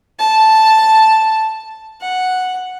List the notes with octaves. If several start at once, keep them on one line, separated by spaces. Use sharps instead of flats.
A5
F#5